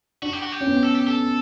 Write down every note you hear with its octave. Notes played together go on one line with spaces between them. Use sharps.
D4 F#4
G4
F#4
G4
C#4
B3
A4
G4
A4